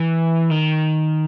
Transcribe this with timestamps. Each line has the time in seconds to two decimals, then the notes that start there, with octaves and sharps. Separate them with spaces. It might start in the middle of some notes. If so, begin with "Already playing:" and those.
Already playing: E3
0.51 D#3